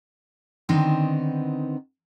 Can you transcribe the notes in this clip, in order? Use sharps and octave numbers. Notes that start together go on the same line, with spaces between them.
D3 D#3 B3 C4 D#4